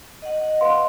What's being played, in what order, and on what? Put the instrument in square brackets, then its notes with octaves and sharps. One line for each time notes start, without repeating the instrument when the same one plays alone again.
[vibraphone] D#5 F#5
[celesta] B4 F5 C6